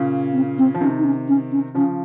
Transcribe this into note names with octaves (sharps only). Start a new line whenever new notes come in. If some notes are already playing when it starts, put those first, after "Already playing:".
Already playing: A#2 C#3
C4
C4
F3
C3 D#3 C#4
D#4
C#4
C#4
C#4
C#3 F3 C#4